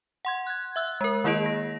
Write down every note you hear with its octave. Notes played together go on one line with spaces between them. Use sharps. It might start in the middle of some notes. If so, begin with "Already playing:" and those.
F#5 C6 G#6
F#6 G#6
E5 E6 F#6
G#3 A#4
D#3 A#3 E4 G#4 D#5 D7
A#6